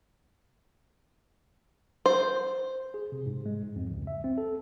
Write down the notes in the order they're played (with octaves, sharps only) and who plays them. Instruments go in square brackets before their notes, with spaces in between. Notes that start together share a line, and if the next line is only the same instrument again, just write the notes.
[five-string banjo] C5
[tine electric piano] G#4
C3
G#2
G#3
G#2
F2
C#2
E5
C4
A4